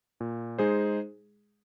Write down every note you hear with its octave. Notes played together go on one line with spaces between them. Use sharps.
A#2
G#3 D#4 G#4 C5